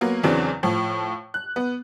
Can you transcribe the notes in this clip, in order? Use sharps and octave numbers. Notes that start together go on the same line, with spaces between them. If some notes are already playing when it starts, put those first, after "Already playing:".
F#3 A#3 B3
E2 C#3 E3 F#3 C4 D4
A2 F3
F#6
B3